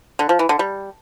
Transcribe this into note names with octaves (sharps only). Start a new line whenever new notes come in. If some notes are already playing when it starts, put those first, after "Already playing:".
D3
F3
E3
D3
G3